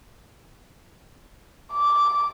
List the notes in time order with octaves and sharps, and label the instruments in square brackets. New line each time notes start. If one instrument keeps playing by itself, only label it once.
[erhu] D6